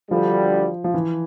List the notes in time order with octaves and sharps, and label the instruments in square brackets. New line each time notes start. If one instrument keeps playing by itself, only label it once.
[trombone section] D2 D3 G3 [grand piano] F3
[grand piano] F3
E3